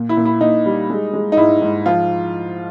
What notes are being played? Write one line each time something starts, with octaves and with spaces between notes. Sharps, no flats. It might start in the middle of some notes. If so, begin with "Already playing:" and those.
Already playing: A#2
E4
A#2
E4
A#2 D#4
G3
G#3
G#3
D#4
G#2 E4
G#2
F3 F4